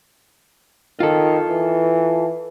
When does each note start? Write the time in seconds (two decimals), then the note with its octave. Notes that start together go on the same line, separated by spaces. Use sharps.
1.00 D#3 F4 A4
1.50 E3